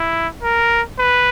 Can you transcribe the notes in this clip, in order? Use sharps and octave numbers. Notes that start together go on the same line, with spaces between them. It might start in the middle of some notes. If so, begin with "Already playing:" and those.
Already playing: E4
A#4
B4